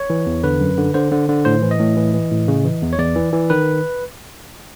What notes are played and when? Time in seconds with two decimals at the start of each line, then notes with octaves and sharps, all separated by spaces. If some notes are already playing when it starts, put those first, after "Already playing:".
Already playing: C#5
0.10 E3
0.26 E2
0.44 D3 B4
0.61 F#2
0.78 D3
0.94 D3 C5
1.12 D3
1.29 D3
1.45 A2 C5
1.62 E3
1.71 D#5
1.79 A2
1.97 E3
2.14 E3
2.31 A2
2.48 C#3
2.65 E3
2.82 E2
2.93 C#5
2.98 E2 D5
3.15 E3
3.33 E3
3.50 D#3 B4